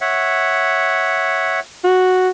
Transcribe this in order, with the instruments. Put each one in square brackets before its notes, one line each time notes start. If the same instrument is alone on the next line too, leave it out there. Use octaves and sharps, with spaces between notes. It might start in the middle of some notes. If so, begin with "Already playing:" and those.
[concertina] C#5 E5 F#5
[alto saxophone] F#4